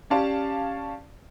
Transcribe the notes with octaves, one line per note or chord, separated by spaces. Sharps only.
C#4 G4 D5 F5 A5